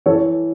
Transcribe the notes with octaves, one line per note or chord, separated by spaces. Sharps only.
E3 A4 C#5